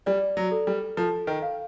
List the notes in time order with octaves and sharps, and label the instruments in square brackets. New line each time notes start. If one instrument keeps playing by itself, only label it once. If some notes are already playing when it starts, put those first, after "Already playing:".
[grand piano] G3 [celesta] D5
[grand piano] F#3
[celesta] A4
[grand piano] G3
[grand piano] F3 [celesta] A4
[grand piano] D#3
[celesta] F5